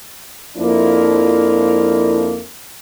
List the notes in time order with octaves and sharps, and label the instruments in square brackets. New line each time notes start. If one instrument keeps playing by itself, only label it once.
[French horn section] F2 F3 A#3 D4 E4 F4